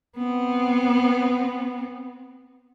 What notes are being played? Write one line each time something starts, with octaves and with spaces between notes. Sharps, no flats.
B3 C4